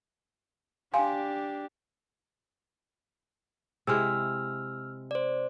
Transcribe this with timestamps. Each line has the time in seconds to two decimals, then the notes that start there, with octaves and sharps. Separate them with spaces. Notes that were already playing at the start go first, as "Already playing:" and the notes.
0.94 D4 G4 F5 G#5 C6
3.87 C3 G#3 E4 E6 F6
5.11 C5 D5